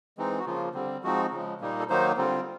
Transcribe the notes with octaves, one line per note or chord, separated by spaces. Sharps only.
E3 G#3 C4 D#4
F#4
C#3 F3 A#3 F4
D3 G3 C4
F3 G#3 C4 D#4 F#4
C#3 F3 G#3
A#2 G3 A#3 D#4
A4
D#3 F#3 A#3 D#4 C5
D3 G3 C4 F4